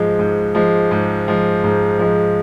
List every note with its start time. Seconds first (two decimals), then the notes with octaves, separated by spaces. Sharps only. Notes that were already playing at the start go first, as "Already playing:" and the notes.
Already playing: G#2 F3 G#3
0.19 G#2
0.55 F3 G#3
0.91 G#2
1.28 F3 G#3
1.64 G#2
1.99 F3 G#3